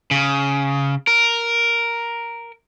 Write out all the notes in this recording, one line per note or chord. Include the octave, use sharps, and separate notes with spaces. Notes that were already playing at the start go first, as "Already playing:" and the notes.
C#3
A#4